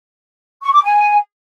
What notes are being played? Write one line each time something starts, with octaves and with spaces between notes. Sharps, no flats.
C#6
D6
G#5